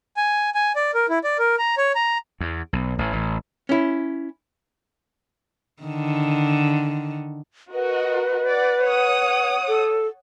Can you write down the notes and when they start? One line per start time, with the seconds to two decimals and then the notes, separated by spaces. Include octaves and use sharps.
0.17 G#5
0.55 G#5
0.76 D5
0.94 A#4
1.09 E4
1.24 D5
1.39 A#4
1.58 A#5
1.78 C#5
1.95 A#5
2.41 E2
2.73 B1
2.99 A1
3.13 A1
3.69 C#4 E4
5.83 D3 D#3
7.73 F#4 A#4 B4 D#5
8.46 D5 F#5
8.83 C#5 F#5 D#6
9.68 A4